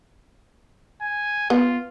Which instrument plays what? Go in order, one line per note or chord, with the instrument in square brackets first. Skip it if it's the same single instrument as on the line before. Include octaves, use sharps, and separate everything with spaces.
[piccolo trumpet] G#5
[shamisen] B3 [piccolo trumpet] F4